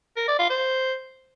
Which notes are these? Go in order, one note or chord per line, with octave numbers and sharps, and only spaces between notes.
A#4
D5
F4
C5